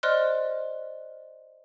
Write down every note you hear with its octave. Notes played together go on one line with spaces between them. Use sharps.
C5 D5 D#5 C6 F6 F#6